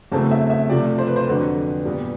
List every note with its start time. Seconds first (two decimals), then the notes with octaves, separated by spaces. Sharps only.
0.12 E2 C#3 F#3 A3 C4 A5
0.31 E5
0.50 E5
0.69 C3 F3 A3 D5
0.99 C5
1.07 B4
1.16 C5
1.27 F2 D3 F#3 B4
1.85 A#2 G3 B3